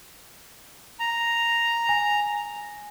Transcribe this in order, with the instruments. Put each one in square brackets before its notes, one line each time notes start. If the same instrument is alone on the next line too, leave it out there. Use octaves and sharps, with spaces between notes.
[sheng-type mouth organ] A#5
[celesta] G#5